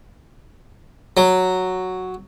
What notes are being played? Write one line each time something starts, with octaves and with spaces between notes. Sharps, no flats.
F#3